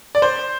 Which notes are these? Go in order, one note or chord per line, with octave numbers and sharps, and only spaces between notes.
D5
C5